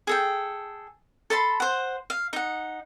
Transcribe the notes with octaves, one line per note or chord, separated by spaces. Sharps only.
G#4 A4 G5
A4 A5 B5 C6
C5 F#5
F5
D#4 F#5